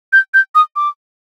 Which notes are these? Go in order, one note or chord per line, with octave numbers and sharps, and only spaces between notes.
G6
G6
D#6
D6